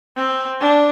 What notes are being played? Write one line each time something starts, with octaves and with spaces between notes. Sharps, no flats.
C4
D4